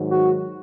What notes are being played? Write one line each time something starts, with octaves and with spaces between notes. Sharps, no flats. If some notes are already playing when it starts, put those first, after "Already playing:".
Already playing: G#2 D#3 F#3
F#4